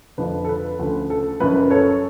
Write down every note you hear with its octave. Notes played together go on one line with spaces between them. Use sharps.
F1 F2 D3 F3 B4
A4
B4
D2 C#3 F3
A4
F#1 F#2 F3 B4
B4
A4 C#5